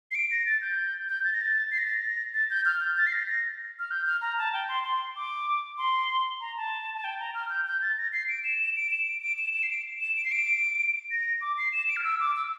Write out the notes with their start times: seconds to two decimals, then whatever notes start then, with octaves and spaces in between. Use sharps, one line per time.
0.11 C7
0.15 D7
0.31 A#6
0.46 A6
0.62 G6
1.09 G6
1.24 A6
1.33 A#6
1.41 A6
1.72 C7
1.78 A#6
1.86 A6
1.93 A#6
2.34 A6
2.50 G6
2.65 F6
2.81 G6
2.97 A6
3.07 C7
3.13 A#6
3.29 A#6
3.79 F6
3.91 G6
4.06 F6
4.21 A#5
4.38 A5
4.53 G5
4.69 C6
4.84 C6
5.16 D6
5.78 C6
6.41 A#5
6.57 A5
6.95 A5
7.04 G5
7.20 A#5
7.35 F6
7.50 G6
7.67 G6
7.82 A6
7.98 A#6
8.13 C7
8.29 D7
8.44 E7
8.59 E7
8.76 D7
8.91 E7
9.07 D7
9.22 D7
9.38 E7
9.53 E7
9.63 C7
9.70 D7
10.01 E7
10.17 D7
10.25 C7
10.32 D7
11.11 A#6
11.41 D6
11.58 C7
11.72 E7
11.89 D7
11.96 F6
12.04 E6
12.20 D6
12.36 E6